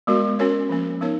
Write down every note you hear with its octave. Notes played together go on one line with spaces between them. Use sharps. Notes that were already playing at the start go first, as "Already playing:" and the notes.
G#3 B3 F#4 A#4
C#4 F#4 A#4 C#5
F3 A#3 C#4
B3 D#4 A#4 C#5